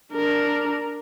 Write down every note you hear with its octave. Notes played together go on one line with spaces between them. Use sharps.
D4 A#4